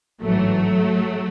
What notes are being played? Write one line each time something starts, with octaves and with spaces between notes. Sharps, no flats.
A1 G#2 E3 F#3 A3